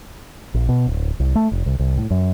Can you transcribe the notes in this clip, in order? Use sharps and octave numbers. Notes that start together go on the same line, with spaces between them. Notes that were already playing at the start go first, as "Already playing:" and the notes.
A#1
B2
D1
C2
A3
F1
C2
C2
A2
F#2